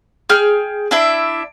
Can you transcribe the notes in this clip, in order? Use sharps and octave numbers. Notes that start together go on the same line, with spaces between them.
G#4 G5 F6
D4 E4 E5